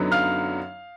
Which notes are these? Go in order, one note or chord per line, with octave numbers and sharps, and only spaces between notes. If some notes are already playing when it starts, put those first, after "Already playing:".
Already playing: F#2 D3 F#3 B3 D#4
F5 F6